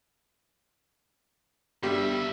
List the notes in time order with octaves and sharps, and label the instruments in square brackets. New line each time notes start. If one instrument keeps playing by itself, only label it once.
[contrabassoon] G1 [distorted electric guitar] G2 E5 [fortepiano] G3